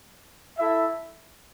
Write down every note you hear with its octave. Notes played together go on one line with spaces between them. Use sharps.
E4 A4 E5